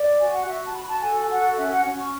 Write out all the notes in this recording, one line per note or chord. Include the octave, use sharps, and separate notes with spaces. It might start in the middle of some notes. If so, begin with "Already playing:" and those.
Already playing: D5
F#4 G#5
F#5
F#4 E5
A5
F#4 B5
A5
A4 G#5
F#4 F#5
C#4 E5
F#5
C#4
C#6